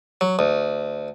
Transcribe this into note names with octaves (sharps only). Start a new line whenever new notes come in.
F#3
D2